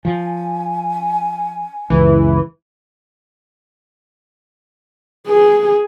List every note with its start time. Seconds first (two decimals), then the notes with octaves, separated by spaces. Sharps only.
0.05 F3 G#5
1.90 F#1 C#2 E3
5.28 G#4